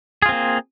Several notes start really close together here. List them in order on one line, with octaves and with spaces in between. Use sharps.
G#4 F4 C4 A#3